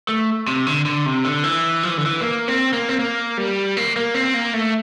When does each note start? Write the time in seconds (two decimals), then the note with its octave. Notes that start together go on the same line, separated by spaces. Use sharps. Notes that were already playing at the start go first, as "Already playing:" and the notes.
0.09 A3
0.48 C3
0.67 D3
0.85 D3
1.06 C3
1.25 D3
1.44 E3
1.83 F3
1.90 E3
1.97 D3
2.06 E3
2.21 A#3
2.48 C4
2.73 A#3
2.89 C4
2.99 A#3
3.37 G3
3.77 A#3
3.96 A#3
4.14 C4
4.34 A#3
4.54 A3